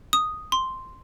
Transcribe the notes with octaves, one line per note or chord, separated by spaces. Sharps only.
D#6
C6